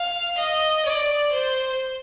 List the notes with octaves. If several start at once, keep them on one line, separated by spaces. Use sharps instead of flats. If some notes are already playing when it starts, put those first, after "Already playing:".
Already playing: F5
D#5
D5
C5